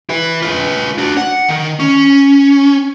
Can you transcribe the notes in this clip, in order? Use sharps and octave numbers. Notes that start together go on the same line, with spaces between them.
E4 B4
F4 B4
D4 F#4
F#5
D#3
C#4